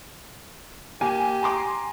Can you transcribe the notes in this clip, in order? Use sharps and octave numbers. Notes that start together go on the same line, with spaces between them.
A#3 G4 G#5
A#5 C6 D6